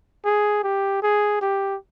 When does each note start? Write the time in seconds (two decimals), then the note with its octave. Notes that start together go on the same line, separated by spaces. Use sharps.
0.25 G#4
0.63 G4
1.02 G#4
1.41 G4